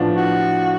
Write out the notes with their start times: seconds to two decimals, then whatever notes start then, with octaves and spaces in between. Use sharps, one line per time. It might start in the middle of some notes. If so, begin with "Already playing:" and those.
Already playing: A2 F3 B3 D4 F4
0.16 F#4